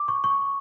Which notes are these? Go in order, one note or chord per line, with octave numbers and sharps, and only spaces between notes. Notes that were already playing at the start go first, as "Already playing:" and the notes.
Already playing: D6
C#6
C#6